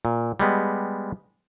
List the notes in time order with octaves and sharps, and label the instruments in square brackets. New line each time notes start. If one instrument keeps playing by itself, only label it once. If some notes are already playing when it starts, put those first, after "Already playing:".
[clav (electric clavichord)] A#2
G3 G#3 B3